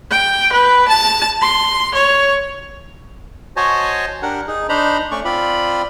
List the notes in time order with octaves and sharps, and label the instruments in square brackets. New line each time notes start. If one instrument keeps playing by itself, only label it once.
[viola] G5
B4
A5
C6
C#5
[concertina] F#4 C5 C#5 D#5 G#5 A5
D4 G4 A#4 F#5
D#4 G#4
D4 D#4 C5 A#5 B5
A3 C#4 D5 C#6
C4 F4 D5 B5